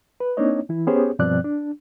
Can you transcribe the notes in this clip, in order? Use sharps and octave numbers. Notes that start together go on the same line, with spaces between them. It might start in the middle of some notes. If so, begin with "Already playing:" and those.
B4
A#3 C4 D4 D#4 C#5 D#5
E3 E4
B3 C#4 G4 G#4 C5 C#5
G2 B2 F3 C4 D5 F#6
D4